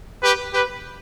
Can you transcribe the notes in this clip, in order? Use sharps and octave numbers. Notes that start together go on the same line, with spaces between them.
G4 B4
G4 B4